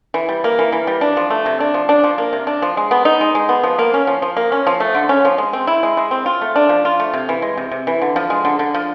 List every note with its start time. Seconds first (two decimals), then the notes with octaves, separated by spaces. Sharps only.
0.14 E3
0.29 G3
0.44 A#3
0.59 E3
0.72 E3
0.87 G3
1.01 D4
1.17 F3
1.30 A3
1.46 C3
1.60 D4
1.74 F3
1.89 D4
2.04 F3
2.18 A#3
2.33 C3
2.47 D4
2.62 F3
2.77 G#3
2.91 B3
3.05 D#4
3.21 G#3
3.35 G#3
3.49 B3
3.63 F3
3.79 A#3
3.94 C#4
4.07 F3
4.22 F3
4.37 A#3
4.52 C#4
4.67 F3
4.80 A3
4.95 D3
5.09 C#4
5.25 F3
5.38 G#3
5.53 C4
5.67 E4
5.83 G#3
5.97 G#3
6.11 C4
6.26 F4
6.41 A3
6.56 D4
6.69 F3
6.85 F4
7.00 A3
7.14 C3
7.29 E3
7.42 G#3
7.57 C3
7.71 C3
7.87 E3
8.02 D3
8.16 F3
8.30 G#3
8.45 D3
8.59 D3
8.74 F3